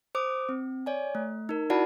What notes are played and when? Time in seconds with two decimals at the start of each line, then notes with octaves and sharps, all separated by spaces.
0.15 C5 D6 D#6
0.49 C4
0.86 C#5 D5 G#5
1.15 A3
1.49 D#4 A#4
1.70 E4 F#4 D5 F#5 A5 B5